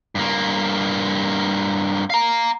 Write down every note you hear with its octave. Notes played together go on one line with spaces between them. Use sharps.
G2 A#3
F5 A#5